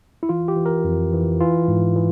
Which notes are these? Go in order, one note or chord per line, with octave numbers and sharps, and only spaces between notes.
E4
E3 F4
G4
E3
A#4
F2
E3
E3 F4
G#2
E3